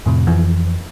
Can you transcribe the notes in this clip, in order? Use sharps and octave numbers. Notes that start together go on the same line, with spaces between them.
F2 A2 C3
F2 E3 F3